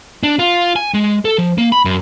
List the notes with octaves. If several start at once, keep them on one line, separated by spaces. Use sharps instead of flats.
D4
F4
G#5
G#3
A4
F3
A#3
B5
F#2